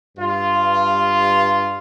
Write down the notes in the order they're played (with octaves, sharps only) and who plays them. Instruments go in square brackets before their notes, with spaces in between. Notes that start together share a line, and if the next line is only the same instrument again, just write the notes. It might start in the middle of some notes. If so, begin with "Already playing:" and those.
[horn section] G2 F4